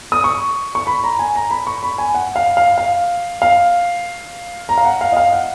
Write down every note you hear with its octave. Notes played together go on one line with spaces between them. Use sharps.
D#6
C#6
C#6
B5
A#5
G#5
A#5
B5
C#6
B5
G#5
F#5
F5
F5
F5
F5
A#5
F5
F#5
F5
D#5
F5
F#5